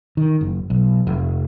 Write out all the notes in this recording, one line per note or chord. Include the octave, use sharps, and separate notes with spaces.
D#3
F#1
B1
F1